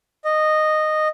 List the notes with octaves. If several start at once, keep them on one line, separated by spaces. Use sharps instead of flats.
D#5